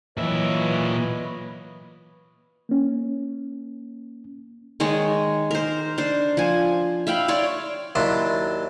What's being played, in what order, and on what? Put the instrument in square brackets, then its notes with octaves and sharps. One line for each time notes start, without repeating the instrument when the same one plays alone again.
[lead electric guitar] A#2 E5 [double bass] E3 F#3 [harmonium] B4 C#5 D#5
[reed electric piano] A#3 C#4
[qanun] D#3 G#3 C#5 D#5
A#4 C5
D4 C5
F3 G#5
E5 F5 G5 B5
C#5 D5 C6 C#6
[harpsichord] D#2 F#3 D4 E4 A5 C6